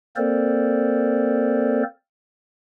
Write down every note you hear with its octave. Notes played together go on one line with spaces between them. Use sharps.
A#3 C4 A4 A#4 C5 D5